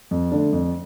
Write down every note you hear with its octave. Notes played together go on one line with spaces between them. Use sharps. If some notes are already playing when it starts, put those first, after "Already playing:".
F2
D3 A3 D4
F2